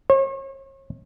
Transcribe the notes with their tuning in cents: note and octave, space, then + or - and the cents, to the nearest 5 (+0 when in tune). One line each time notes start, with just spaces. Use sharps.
C#5 -40